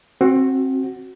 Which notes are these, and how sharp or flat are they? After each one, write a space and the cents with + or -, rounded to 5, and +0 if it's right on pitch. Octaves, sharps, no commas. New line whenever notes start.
C4 +25 F#4 +0